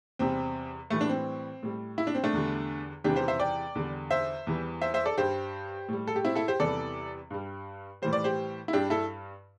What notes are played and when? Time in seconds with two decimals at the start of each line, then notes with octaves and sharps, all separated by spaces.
0.19 E2 C3 G3 C4
0.90 A2 E3 G3 A3
1.01 D4
1.09 C4
1.63 A2 G3
1.98 E4
2.07 D4
2.15 C4
2.24 A3 D4
2.33 E2 D3 G3
3.04 E2 C3 E3 G3 D4 G4
3.16 G4 C5
3.28 C5 E5
3.39 D5 G5
3.75 E2 D3 G3
4.11 C5 E5
4.47 E2 E3 G3
4.81 C5 E5
4.94 C5 E5
5.05 A4 D5
5.18 G2 G3 G4 C5
5.89 A2 G3
6.08 A4
6.16 G4
6.25 C4 E4
6.35 E4 A4
6.48 G4 C5
6.59 E2 C3 E3 G3 A4 D5
7.30 G2 G3
8.02 A2 E3 G3 C5
8.13 D5
8.24 G4 C5
8.68 E4
8.73 G2 G3 D4 G4
8.90 E4 A4